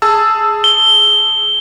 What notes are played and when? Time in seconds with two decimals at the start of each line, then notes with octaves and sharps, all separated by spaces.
0.02 G#4 A5 E6
0.64 G7